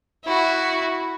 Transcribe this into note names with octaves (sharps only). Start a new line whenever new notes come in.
E4 F#4